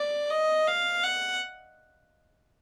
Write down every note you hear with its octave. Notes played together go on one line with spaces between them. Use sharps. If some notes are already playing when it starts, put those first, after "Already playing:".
Already playing: D5
D#5
F5
F#5